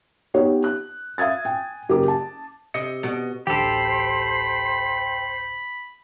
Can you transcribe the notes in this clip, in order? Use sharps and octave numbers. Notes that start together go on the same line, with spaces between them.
B3 D#4 G4 C#5
F#6
E5 F5 D#6 G#6 A6
G5 G#5
F#1 G4 G#4 A#4 D6
A5
C3 D#5 C#7
B2
A1 D2 D3 G4 A4 C5 B5